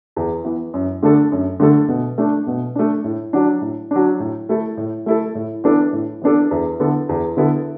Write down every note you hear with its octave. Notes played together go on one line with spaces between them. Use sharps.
E2
E3 B3
F#2
D3 A3 D4 A4
F#2
D3 A3 D4 A4
B2
A3 D4
B2
A3 D4
A2
F#3 D4
A2
F#3 D4
A2
A3 E4 A4
A2
A3 E4 A4
A2
E3 B3 D4 A4
A2
E3 B3 D4 A4
E2
D3 B3 E4 A4
E2
D3 B3 E4 A4